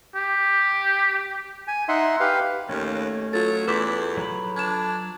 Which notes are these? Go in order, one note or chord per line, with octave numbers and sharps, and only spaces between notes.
G4
G#5
D#4 E5 F#5 C6
G4 B4 F5
D#2 A3 C#4
F#3 F4 A4 A6
E2 B4 D6 B6
F#3 B5
D4 G#6 E7